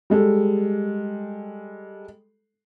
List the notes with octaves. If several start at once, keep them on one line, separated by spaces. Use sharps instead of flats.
G3 G#3 A4